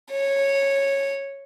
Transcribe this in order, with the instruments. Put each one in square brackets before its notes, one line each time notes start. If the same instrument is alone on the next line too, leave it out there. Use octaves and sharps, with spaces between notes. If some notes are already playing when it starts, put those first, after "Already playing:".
[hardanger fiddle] C#5